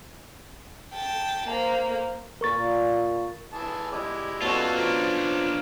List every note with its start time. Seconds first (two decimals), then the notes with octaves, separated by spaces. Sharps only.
0.94 G5 A5
1.48 A#3 C5
2.41 A#2 A#4 C#6 A6
3.53 E3 G#4 A5
3.92 G#3 E4 G4 D5 D#5
4.42 B2 A3 C#4 F4 A4
4.75 F3 A#3 D4 A#4